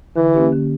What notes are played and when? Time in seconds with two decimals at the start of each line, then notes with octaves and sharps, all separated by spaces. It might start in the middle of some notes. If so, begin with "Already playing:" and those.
0.16 D3 E3
0.34 A#3 C#4 G4
0.52 D3